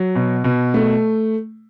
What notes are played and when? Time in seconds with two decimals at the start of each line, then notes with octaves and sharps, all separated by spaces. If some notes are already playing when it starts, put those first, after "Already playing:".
Already playing: F#3
0.15 B2
0.44 B2
0.74 A3